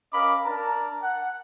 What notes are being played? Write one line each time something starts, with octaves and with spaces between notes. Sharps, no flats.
C#4 A#4 D#5 F5 B5 D6
D4 A#4 A5 A#5
F#5